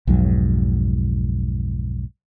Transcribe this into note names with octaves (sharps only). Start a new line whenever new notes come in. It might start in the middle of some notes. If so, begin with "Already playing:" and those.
B1 F2 G#2 F#3